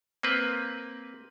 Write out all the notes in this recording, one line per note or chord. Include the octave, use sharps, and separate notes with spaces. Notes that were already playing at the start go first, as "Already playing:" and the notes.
A#3 C4 B4